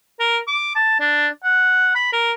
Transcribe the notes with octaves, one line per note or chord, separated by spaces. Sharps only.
A#4
D6
A5
D4
F#5
B5
A#4